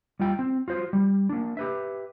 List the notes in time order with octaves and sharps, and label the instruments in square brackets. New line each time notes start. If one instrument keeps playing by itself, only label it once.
[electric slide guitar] G3 F4 G5
C4
F4 F#4 C5
G3
A#3 D4
G4 B4 E5